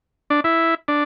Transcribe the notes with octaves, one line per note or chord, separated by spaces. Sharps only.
D4
E4
D4